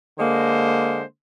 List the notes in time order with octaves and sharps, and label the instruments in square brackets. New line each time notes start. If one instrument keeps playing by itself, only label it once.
[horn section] D3 G#3 A#3 C5